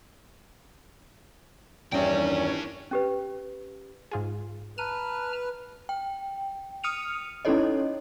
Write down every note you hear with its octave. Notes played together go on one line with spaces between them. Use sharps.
A#1 E2 G2 D#3 C#4 D4 G5
C#4 G4 B4
G#2 F4 G#4
B4 A5 A#5 F6 D#7
G5
D#6 F6 C#7 D#7 F7
C#4 D#4 E4 A4 C#5 D#5